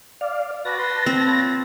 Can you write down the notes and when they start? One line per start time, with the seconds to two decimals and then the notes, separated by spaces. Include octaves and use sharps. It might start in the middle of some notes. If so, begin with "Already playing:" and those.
0.21 D5 F5
0.65 F#4 B4 D5 A5 A#6
0.78 B4 C6
1.06 C4
1.26 F4 C#5